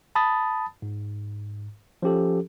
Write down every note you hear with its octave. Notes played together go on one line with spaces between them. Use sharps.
A5 B5 D#6 A6
G#2
F3 C#4 G4 A4